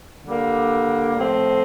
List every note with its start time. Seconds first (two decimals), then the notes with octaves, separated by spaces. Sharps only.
0.24 D3 G3 A#3
1.16 A2 F3 C4